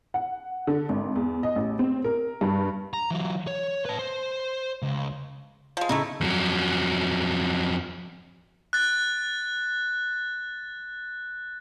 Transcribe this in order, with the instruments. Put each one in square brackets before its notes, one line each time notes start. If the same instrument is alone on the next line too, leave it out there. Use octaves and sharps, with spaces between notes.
[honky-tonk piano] F#5
D3
G#1
E2
D#5
A1
C4
A#4
G2
[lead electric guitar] A#5
E3 F#3
C#5
B4 A5
C5
C#2
[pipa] F3 G#3
[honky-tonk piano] C#3 [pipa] A3 D#4 E4
[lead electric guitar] F2 F#3
[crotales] F#6 A6